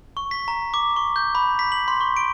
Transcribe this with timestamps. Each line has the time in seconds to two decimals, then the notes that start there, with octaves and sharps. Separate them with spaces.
0.17 C#6
0.31 B6
0.48 A#5
0.74 D6
0.96 C#6
1.16 G6
1.35 B5
1.59 B6
1.72 F#7
1.88 C6
2.01 C#6
2.17 D7